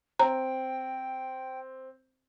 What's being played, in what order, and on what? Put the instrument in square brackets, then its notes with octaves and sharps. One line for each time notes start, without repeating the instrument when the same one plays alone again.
[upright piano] C4 [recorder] G5 [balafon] A#5